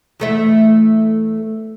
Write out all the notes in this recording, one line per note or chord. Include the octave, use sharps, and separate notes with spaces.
E2 A3 E5